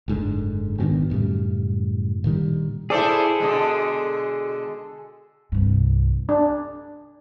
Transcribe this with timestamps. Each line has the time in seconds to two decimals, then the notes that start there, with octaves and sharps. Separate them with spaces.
0.08 F#1 G#2 B2 D3
0.78 G#1 B2 D3 D#3
1.10 F#2 A2 C#3 G3
2.24 A#2 D3 D#3 G3
2.90 E4 G#4 A4 C5 D5
3.40 B2 D3 G#3
5.52 C2 G2
6.29 D4